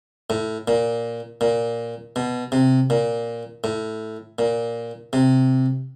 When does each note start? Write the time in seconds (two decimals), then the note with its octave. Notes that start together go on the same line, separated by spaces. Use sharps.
0.30 A2
0.68 A#2
1.41 A#2
2.16 B2
2.52 C3
2.90 A#2
3.64 A2
4.39 A#2
5.13 C3